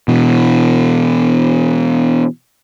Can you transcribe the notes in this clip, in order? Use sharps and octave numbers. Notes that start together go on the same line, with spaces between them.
B2 E3